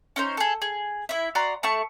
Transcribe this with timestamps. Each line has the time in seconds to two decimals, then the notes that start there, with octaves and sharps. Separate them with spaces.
0.16 C#4 D#4 C5
0.37 G#4 A4
0.62 G#4
1.09 E4 E5
1.35 F#4 D5 A#5 C6
1.63 A3 E4 A5 C#6